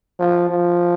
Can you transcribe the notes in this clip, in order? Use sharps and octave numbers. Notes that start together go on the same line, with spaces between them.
F3
F3